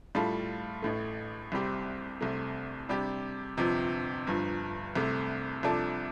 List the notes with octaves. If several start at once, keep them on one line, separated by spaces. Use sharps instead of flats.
A2 G3 F4 A4
A1 A2 A3
C2 C3 G3 C4 G4
C2 C3 A3
C3 G3 D4 G4
G1 F2 C3 F3
G1 G2 F3
C2 C3 A3
C2 C3 F3 D4 A4